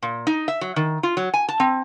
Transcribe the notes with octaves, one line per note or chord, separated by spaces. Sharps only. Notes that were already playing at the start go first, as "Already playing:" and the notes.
A#2
D#4
E5
F#3
D#3
F4
F#3
G#5
A5
C4